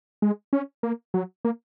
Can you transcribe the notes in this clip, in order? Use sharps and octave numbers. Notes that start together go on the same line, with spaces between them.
G#3
C#4
A#3
F#3
A#3